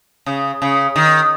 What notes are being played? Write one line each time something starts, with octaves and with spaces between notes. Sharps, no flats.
C#3
C#3
D#3